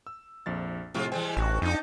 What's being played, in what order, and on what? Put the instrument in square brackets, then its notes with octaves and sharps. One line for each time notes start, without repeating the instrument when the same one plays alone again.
[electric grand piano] E6
A#1 F2 A6
[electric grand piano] A2 C3 [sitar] F3 G#3 F4
[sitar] E3 G3 G#3 [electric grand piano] C5 G5 G#5
[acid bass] A1 [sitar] G2 F#4
[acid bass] F2 [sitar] D4 D#4